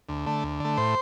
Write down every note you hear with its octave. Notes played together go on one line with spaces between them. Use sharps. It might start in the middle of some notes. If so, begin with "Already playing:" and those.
D2
D3 A3
D2
D3 A3
A2 C5